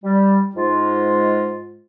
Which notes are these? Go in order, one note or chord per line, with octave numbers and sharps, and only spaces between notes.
G3
G#2 G#3 F4